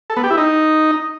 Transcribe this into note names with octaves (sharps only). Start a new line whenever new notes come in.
A4
B3
G4
E4
D#4